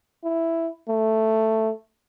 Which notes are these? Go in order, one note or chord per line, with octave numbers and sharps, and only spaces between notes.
E4
A3